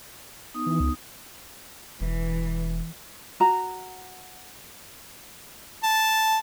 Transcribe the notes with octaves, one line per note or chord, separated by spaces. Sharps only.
B3 D#4 D#6
E3
C#2
E1 E3
F#4 A#5
A5